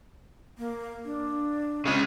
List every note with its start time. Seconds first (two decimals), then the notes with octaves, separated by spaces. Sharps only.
0.58 A#3
1.05 D4
1.86 C#3 G#3 C4